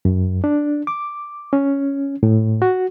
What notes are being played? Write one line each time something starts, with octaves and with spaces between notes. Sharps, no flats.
F#2
D4
D6
C#4
A2
F#4